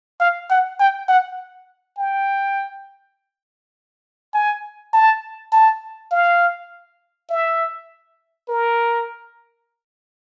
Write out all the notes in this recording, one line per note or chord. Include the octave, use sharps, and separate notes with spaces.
F5
F#5
G5
F#5
G5
G#5
A5
A5
F5
E5
A#4